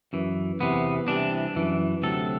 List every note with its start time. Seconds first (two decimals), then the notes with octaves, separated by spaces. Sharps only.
0.13 F#2 E3
0.60 E2 C3 E3 B3
1.08 C2 C3 E3 D4
1.55 F#2 E3
2.02 D2 C3 F#3 A4